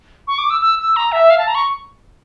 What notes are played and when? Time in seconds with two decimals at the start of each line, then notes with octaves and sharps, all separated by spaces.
0.27 C#6
0.38 D6
0.50 E6
0.61 E6
0.79 E6
0.96 A#5
1.12 E5
1.30 F5
1.38 A5
1.47 A#5
1.55 C#6